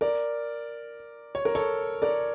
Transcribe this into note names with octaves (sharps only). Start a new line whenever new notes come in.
A#4 D5
C#5
A#4
A4 C#5
A#4 D5